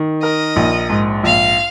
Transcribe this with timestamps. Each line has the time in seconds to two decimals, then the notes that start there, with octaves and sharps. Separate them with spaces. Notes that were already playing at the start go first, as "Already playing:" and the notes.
Already playing: D#3
0.22 A#4 D#5
0.56 A#1
0.89 G#2
1.23 A#1 F5